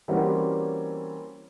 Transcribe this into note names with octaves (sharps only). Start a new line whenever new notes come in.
E3 G3 A#3 C4 C#4 F#4